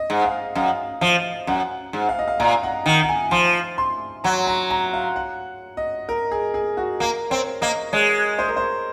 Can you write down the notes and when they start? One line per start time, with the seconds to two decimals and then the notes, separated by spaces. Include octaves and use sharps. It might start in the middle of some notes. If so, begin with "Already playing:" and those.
Already playing: D#5
0.10 G#2
0.24 F5
0.55 F#2 F5
1.01 F3 F5
1.47 F#2 F#5
1.93 G#2
2.09 F5
2.19 D#5
2.28 F5
2.40 A#2 A#5
2.63 F#5
2.86 D#3 F#5
3.03 F#5
3.09 G#5
3.31 F3 C6
3.78 C6
4.24 F#3 A#5
4.47 A#5
4.70 A#5
4.93 F5
5.16 F#5
5.77 D#5
6.09 A#4
6.31 G#4
6.54 G#4
6.77 F#4
7.00 A#3 A#4
7.30 C4 C#5
7.61 A#3 D#5
7.92 G#3 C#5
8.39 C5
8.48 A#4
8.57 C5